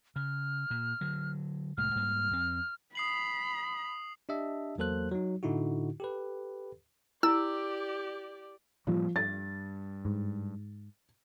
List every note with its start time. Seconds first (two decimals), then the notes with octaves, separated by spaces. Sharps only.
0.16 C#3 F6
0.71 A#2
1.01 D3 F#3
1.77 C2 A2 G#3 F6
1.95 G#2 G3 A#3
2.31 F2 C4
2.95 B5 D#6 C7 F#7
4.29 D4 G4 D#5 E5 A5
4.78 E2 F#3 A#3 A4 C5 F#6
5.11 F#3 D#4
5.43 A2 D3 D#4 E4 F#4
6.00 G4 A4 B4
7.23 E4 G4 D5 E6
8.87 A2 F3 G3 A#3
9.16 G2 A6
10.05 G#2